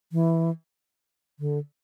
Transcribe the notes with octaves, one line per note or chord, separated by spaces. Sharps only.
E3
D3